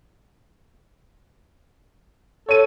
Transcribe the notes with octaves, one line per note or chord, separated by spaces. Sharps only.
A4 C#5 D#7